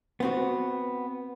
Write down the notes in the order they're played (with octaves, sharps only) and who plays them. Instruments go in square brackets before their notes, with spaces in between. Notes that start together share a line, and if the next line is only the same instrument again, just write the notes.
[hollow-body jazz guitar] B3 C4 F#4